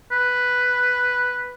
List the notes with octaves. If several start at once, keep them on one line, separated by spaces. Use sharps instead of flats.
B4